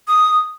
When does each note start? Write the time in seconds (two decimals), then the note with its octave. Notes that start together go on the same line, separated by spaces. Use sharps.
0.07 D#6